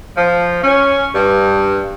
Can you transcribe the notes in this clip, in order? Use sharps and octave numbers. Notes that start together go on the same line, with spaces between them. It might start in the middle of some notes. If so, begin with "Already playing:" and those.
F3
C#4
G2